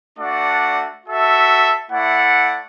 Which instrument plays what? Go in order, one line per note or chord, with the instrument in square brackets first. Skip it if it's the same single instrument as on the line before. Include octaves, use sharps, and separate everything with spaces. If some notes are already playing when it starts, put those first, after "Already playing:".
[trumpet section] A3 D4 F#4 D5 F#5
F#4 A4 E5
A3 E4 D5 F#5